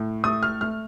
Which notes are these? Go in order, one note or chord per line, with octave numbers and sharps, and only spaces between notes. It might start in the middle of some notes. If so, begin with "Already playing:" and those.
Already playing: A2
A3 D#6
F6
A3 F6